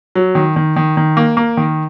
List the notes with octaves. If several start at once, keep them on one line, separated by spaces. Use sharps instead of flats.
F#3
D#3
D#3
D#3
D#3
A#3
A#3
D#3